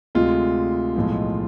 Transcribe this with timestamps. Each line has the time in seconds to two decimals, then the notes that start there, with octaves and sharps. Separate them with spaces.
0.15 D2 C3 G#3 F4
0.96 B1 A2 F3 G#3